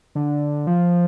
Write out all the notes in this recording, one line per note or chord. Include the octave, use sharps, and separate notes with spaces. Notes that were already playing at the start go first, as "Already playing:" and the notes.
D3
F3